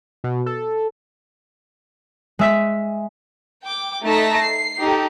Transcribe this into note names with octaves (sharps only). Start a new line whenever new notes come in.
B2
A4
G#3 E5 B6
G5 D6
A3 D#4 A5 A#6 B6
C7
D#4 G4 A4